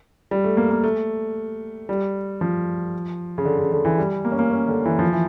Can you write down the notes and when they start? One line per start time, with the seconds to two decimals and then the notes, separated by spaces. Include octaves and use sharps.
0.31 G3
0.44 A3
0.57 A#3
0.71 A#3
0.84 A3
1.89 G3
2.41 F3
3.38 C#3
3.45 D3
3.59 C#3
3.72 D3
3.85 E3
3.98 G3
4.25 A#3
4.32 C#4
4.39 A#3
4.51 C#4
4.68 D3
4.85 E3
4.99 F3
5.13 E3